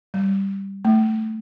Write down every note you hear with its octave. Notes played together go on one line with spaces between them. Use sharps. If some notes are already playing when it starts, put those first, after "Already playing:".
G3
A3